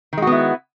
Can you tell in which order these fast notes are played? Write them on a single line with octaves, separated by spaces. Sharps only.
D#3 G#3 F#4 B3 E4